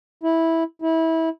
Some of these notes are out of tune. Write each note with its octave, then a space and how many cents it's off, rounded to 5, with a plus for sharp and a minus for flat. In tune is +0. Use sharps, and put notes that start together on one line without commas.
E4 -10
E4 -25